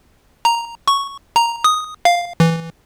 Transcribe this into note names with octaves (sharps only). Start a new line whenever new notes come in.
A#5
C#6
A#5
D#6
F5
E3